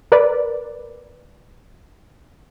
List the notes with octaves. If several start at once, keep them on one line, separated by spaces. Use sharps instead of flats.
A#4 B4 D5